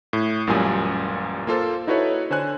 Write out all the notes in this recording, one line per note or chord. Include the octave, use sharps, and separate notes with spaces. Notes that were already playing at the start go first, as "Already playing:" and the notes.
A2
A1 F#2 A#2 G3 G#5 D#6
A#3 F4 A4 C5
D#4 E4 F#4 A4 B4 C#5
D3 C5 C#5 G#5 F#6